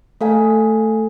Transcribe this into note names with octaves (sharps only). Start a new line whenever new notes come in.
A3 A4 F5 G#5